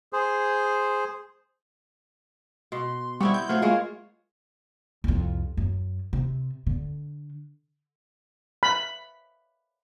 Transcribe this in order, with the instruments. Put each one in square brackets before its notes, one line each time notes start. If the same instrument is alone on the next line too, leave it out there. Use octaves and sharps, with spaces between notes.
[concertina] G#4 C5
[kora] B2 [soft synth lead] C6
[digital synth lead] G3 [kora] B3 C4 E4 [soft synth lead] C#6
[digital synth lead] G6
[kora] F#3 C5 [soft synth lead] A3 [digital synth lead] F4
[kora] G#3 A#3 C#5
[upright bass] C2 F2
F#2
C3
D3
[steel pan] B5